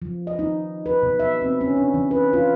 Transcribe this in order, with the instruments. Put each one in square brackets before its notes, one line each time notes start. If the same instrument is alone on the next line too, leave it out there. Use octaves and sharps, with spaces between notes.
[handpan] F3
D#5
D#4
B4
B2
E5
C4
C#4
D4
E3
B4
F4